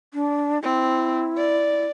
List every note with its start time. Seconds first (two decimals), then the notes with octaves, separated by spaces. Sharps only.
0.14 D4
0.63 C4 E4
1.37 D5